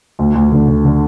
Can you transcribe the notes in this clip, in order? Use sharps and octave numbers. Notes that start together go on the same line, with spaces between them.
D2
D2
D3
D3
D3